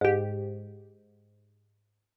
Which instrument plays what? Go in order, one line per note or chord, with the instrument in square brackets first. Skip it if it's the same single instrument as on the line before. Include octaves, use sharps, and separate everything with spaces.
[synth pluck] G#2 G4